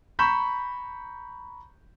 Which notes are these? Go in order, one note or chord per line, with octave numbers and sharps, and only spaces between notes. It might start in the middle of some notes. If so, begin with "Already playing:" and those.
A#5 B5 C#6 G6 B6 E7